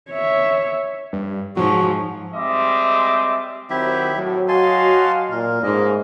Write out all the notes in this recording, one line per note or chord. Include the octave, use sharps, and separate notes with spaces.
C#5 E5
G2
G#2 F3 F#3 C#6
G3 G#3 C4 D#5 E5 D6
D#3 F#3 C4 E4 G4 E5
A2 F#3
F#4 D#5 F5 G#5 A5 C6
A#2 A#4
G#2 C#3 A3 A#3 D#5